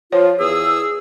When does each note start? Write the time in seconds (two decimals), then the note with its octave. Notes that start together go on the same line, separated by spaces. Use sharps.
0.12 F3 F4 C#5
0.39 E2 G#4 E6